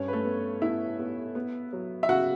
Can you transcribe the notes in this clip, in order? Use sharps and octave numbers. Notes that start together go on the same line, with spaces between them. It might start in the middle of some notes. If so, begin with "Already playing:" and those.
Already playing: G2 C#4 C#5
B4
A3 A4
B3
B3 E4 E5
B3
B3
F#3
E5
C#3 F#4 F#5